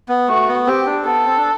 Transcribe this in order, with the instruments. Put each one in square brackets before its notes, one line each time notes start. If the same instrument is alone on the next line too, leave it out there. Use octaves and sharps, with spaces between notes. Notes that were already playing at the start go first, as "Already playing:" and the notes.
[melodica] B3
[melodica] A3 [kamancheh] F#4
[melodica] B3
[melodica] C4 [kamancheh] G4
[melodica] D4
[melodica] B3 [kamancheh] A4
[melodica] C4
D4